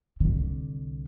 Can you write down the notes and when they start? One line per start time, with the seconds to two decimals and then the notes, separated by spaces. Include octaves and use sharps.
0.20 C2 D3